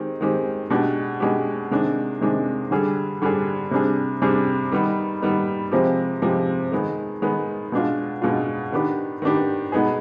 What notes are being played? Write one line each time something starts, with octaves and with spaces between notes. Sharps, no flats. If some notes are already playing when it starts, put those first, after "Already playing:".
Already playing: D#3 G#3 C4 G4
D#3 G#3 C4 G4
B2 G#3 D4 G4
B2 G#3 D4 G4
C3 D#3 G#3 D4
C3 D#3 G#3 D4
D3 G3 D4 G#4
D3 G3 D4 G#4
C3 G3 D4 G#4
C3 G3 D4 G#4
D#3 G3 B3 D#4
D#3 G3 B3 D#4
C3 F3 G#3 C4 G4
C3 F3 G#3 C4 G4
D#3 G#3 B3
D#3 G#3 B3
B2 G#3 D4 F4
B2 G#3 D4 F4
D#3 B3 D4 G4
D#3 B3 D4 G4
B2 G#3 B3 D#4 G#4